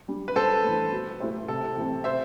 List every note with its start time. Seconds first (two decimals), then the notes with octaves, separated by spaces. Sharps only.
0.08 G3 D4
0.28 B4
0.36 G2 A4 C5
0.64 E3 A3
0.92 B2
1.20 A3 E4 G4 C5
1.48 C3 A4
1.76 E3 A3 C4
2.04 C3 C5 E5